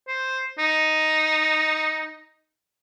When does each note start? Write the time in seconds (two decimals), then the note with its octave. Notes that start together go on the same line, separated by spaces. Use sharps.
0.08 C5
0.59 D#4